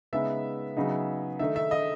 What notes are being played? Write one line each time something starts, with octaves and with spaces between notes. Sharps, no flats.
C#3 G#3 B3 D#4 E5
C#3 F#3 B3 D#4
D#3 A3 D#4 E5
E5
D#5